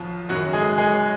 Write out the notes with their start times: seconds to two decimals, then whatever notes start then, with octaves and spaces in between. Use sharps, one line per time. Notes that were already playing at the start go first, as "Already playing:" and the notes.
Already playing: B1 B2 F3 F4
0.29 F#1 F#2 D#3 F#3 F#4
0.53 G#3 G#4
0.78 G#3 G#4